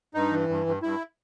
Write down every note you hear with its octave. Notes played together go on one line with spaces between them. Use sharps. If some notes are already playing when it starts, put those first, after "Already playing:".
G2 D#4
E3
G2
G2
G2 E4